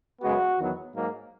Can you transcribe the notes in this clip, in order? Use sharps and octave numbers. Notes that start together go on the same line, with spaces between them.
F#2 C#3 G#3 B3 F#4
E2 D#3 F#3 B3
G#2 F#3 A#3